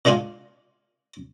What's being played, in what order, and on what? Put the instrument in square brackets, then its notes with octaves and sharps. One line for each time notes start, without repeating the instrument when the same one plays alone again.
[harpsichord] A#2 G#3 D4 F4 G#5